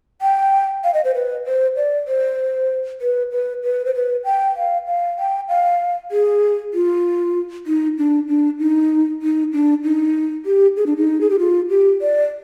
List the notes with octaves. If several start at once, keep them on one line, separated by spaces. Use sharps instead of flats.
G5
F5
D#5
C5
B4
C5
D5
C5
B4
B4
B4
C5
B4
G5
F5
F5
G5
F5
G#4
F4
D#4
D4
D4
D#4
D#4
D4
D#4
G4
G#4
D4
D#4
G#4
G4
F4
G4
D5